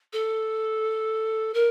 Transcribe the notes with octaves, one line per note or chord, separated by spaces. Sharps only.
A4
A#4